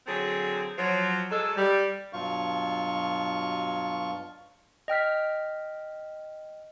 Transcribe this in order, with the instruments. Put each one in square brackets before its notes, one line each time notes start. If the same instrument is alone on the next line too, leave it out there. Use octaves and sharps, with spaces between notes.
[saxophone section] D3 F#3 C4 G#4
F3 F#3
F#3 G#3 A4
G3
[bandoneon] G2 B2 F#3 F4 F5 C#6
[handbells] D#5 G5 F6 B6